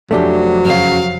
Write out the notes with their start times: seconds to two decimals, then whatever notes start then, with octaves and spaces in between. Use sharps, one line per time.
0.11 F1 F2 F#3 A3 D4 G4
0.65 F#2 A#2 C#3 F5